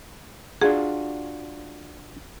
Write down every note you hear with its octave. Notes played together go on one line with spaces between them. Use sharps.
D4 F4 F#4 G#4